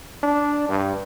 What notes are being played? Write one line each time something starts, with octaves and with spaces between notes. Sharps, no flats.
D4
G2